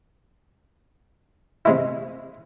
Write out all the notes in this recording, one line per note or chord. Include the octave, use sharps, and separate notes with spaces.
C3 G#3 E4